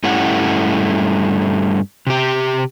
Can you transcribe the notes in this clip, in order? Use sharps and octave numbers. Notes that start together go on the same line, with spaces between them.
G2 G3 A3 C#4 E4 F#5
C3 G4